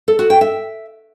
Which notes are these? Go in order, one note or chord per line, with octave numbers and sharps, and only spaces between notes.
A4
F#4
G5
E5